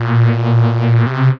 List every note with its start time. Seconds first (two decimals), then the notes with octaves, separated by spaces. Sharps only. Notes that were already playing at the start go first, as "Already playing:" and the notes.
Already playing: A#2
1.06 C3